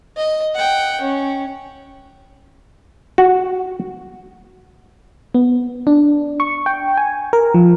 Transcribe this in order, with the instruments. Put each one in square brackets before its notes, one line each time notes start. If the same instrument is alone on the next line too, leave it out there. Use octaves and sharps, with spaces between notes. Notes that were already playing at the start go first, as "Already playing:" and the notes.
[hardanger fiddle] D#5
F#5 G5
C#4
[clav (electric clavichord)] F#4
[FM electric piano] B3
D4
C#6
G5
G#5
A#4
F3